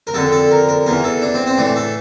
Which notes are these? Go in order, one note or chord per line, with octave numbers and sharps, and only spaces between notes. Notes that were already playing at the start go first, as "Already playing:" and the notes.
A#4
F2 D3 A4
A4
A#4
A#4
E2 E3 A#4
A4
D4
C4
C4
A2 E3 D4
A4